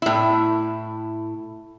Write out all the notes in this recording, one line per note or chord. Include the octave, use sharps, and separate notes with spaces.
A2 E4